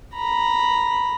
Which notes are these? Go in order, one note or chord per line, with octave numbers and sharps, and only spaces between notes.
A#5 B5